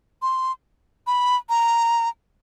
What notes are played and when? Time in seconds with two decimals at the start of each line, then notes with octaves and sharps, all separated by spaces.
0.22 C6
1.07 B5
1.49 A#5